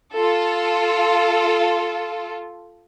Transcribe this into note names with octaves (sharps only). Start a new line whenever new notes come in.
F4 A4